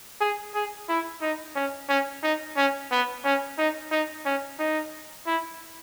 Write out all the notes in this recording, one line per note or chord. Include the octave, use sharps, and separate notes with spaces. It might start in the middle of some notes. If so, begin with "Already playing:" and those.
G#4
G#4
E4
D#4
C#4
C#4
D#4
C#4
B3
C#4
D#4
D#4
C#4
D#4
E4